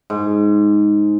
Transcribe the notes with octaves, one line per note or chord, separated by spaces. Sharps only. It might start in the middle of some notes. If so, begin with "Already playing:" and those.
G#2